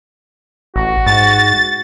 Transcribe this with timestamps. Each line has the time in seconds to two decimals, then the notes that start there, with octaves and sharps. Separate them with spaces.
0.76 A1 F#4
1.06 G#2 A6